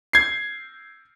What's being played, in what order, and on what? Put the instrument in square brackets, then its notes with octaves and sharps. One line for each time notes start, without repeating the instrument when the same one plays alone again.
[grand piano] G#6 C7